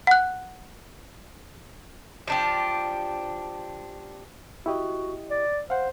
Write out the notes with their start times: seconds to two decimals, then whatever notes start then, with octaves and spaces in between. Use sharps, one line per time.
0.07 F#5 F#6
2.27 F3 D4 G4
4.66 E4 F#4 G4 D#5
5.31 D5
5.70 C5 F5 F#5